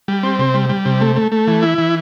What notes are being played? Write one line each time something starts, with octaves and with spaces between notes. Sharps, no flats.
G3
C4
C3
G3
G3
C3
A3
A3
A3
E3
E4
E3